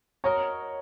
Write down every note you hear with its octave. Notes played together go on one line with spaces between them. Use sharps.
F#4 A#4 C#5 D#5 A#5